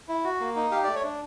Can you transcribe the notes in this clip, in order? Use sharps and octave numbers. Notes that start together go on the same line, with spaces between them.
E4
F#4
A#3
D#4
G4 F5
A3 D5
C#5
D4